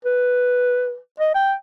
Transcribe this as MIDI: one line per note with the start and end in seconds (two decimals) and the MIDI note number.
0.05 0.98 71
1.20 1.31 75
1.35 1.54 79